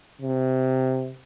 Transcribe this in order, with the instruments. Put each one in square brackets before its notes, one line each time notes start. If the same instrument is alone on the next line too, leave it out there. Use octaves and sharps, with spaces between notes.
[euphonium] C3